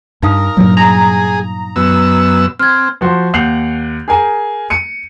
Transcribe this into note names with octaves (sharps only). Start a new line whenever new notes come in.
G2 D#4 A#4 F5 D#6
G2 A#2 F#3
G#4 A#5
F#2 B3 E6
C4 F6 G#6
F3 F#4 C5
D#2 F#5 G6 C7 F7 F#7
G#4 A#4 G#5
C#7 D#7